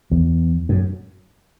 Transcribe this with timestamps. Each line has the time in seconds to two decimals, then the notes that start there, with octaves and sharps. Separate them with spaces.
0.11 E2
0.69 F#2